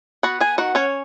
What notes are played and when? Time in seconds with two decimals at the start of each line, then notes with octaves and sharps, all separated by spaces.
0.23 B3 F#4 F#5
0.40 G#4 G#5
0.58 D#3 F#4 F#5
0.75 C#4 C#5